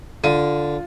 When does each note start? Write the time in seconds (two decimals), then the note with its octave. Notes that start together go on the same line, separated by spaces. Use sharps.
0.24 D3 F4 D#7